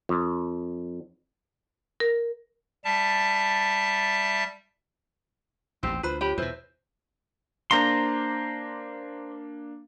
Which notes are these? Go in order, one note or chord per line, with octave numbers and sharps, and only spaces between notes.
F2
A#4
G3 E5 A5
A1 D#2 C4 G4
D2 F4 B4 C5 B5
G4 C#5 B5
E2 B2 E3 C5
A#3 D4 C5 F5 A#5 C6